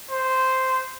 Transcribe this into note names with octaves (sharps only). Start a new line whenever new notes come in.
C5